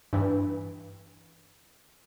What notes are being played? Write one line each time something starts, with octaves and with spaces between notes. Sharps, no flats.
G2 E3